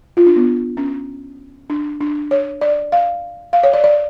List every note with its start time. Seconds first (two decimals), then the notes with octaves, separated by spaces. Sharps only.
0.17 F4
0.27 D4
0.36 B3
0.77 C#4
1.70 D4
2.01 D4
2.31 C#5
2.61 D5
2.92 F5
3.53 F5
3.63 C#5
3.73 D5
3.84 D5